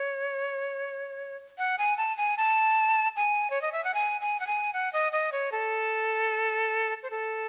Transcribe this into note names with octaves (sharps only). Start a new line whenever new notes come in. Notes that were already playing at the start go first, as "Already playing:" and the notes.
Already playing: C#5
F#5
G#5
A5
G#5
A5
G#5
C#5
D#5
E5
F#5
G#5
G#5
F#5
G#5
F#5
D#5
D#5
C#5
A4
C5
A4